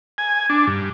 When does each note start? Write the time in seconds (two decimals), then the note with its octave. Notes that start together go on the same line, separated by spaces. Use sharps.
0.18 G#5
0.50 D4
0.67 G2